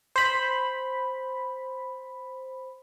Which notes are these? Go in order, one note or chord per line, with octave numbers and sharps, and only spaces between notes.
C5 B5